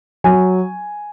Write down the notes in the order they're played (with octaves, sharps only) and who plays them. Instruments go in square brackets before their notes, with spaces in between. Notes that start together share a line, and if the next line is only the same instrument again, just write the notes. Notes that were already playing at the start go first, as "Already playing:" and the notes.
[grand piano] F#3 G#5